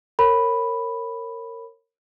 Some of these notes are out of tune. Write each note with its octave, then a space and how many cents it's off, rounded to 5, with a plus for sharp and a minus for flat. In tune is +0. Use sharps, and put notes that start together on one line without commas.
A#4 -25 C#5 -30 B5 +0